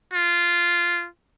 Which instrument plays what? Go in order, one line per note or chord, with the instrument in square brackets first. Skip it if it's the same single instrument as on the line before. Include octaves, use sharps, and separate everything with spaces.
[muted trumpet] F4